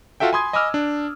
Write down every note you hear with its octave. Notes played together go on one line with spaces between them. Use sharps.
F4 F#4 A4 E5 G5
G#5 B5 C6 D#6 G#6
D#5 G#5 B5 D6 E6 F6
D4